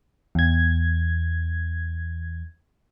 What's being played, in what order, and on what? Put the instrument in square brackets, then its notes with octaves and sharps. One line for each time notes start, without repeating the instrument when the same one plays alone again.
[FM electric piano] E2 G#6